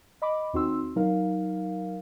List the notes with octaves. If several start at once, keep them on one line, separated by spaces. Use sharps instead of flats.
D#5 B5 D6
D#2 C4 D#4 F#4 C6 E6
F#3 D#4 A#4 F5